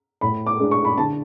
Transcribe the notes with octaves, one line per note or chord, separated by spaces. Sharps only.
A2 B5
D6
G#3 D4
C#6
B5
D3 A5